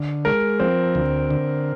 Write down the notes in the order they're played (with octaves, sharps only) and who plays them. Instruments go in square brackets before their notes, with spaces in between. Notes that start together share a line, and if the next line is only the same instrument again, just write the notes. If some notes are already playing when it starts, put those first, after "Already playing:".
Already playing: [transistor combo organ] D3
[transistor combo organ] G#3 [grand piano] A#4
[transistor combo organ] F3 [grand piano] C4
[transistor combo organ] D2
D3